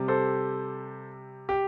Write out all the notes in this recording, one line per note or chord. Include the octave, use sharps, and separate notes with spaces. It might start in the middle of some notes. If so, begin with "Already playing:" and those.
Already playing: C3 G3
A4 C5
G4